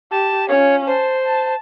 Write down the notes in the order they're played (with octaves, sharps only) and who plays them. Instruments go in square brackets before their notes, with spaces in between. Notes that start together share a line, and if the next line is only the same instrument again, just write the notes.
[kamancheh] G4 [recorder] A5
[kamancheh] C#4 F4 [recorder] C#5
[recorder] C5 [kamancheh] A5
[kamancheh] A5